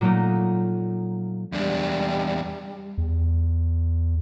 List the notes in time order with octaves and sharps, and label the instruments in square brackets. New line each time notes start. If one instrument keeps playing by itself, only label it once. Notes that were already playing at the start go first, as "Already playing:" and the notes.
[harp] A#2 F#3 A3 A#3 D#4
[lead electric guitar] E2 D4 [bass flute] G3
[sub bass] E2